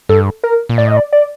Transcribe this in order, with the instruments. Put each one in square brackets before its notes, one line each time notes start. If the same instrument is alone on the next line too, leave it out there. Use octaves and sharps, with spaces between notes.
[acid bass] G2 [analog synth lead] A4
[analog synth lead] A#4
[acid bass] A#2
[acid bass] A2 [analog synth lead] D5
[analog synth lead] D#5
D5
D5